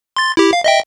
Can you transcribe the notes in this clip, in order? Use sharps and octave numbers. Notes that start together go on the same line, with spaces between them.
C6 A6
E4 G4
F5
D#5 E5 G5